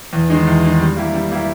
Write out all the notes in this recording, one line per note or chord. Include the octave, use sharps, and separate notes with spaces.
E2
D#3 G#3 D#4
E2
D#3 G#3 D#4
G3
A#3 E4 G4
G3
A#3 E4 G4